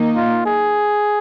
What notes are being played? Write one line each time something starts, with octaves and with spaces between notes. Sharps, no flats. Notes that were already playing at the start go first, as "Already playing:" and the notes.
Already playing: D#3 A#3 D#4
F4
G#4